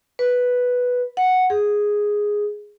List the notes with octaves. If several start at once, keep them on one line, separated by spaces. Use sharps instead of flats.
B4
F#5
G#4